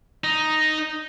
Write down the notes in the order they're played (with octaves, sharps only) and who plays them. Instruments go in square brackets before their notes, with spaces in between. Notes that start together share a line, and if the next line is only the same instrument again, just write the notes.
[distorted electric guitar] D#4